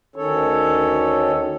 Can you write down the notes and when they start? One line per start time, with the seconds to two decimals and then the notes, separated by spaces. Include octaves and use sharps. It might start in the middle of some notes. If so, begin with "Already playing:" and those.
0.16 D2 D#3 C#4 A4 C#5